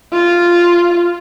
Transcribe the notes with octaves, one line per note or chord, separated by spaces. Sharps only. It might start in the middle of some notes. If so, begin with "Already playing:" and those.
F4